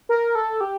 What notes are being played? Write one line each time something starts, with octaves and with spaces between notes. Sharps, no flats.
A#4
A4
G4